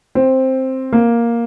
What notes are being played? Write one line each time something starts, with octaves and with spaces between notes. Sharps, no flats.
C4
A#3